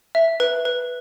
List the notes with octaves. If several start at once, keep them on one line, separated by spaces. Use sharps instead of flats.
E5
B4
B4